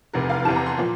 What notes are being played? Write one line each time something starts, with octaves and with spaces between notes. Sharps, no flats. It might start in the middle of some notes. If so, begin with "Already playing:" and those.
F1 E2 C3 A#4
F5
E2 C3 E3 A5
A#5
C6
A#2 F3